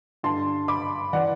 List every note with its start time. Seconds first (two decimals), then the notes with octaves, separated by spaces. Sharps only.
0.23 G2 D3 A5 C6
0.68 B5 D6
1.13 E3 D5 F#5